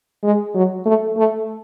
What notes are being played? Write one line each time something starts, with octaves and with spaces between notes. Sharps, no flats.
G#3
F#3
A3
A3